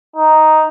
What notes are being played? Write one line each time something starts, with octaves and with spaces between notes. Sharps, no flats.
D#4